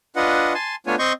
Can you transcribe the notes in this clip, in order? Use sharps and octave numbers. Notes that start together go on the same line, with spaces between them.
D4 F4 B4 D#5 F#5
G#5 A5 C6
A3 B3 D4 F4 C#5 G#5
C4 D#5 C6 C#6 G6